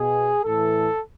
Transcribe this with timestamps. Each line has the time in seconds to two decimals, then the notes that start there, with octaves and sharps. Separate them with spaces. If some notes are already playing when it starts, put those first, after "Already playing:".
Already playing: B2 G#4
0.44 A2 E3 A4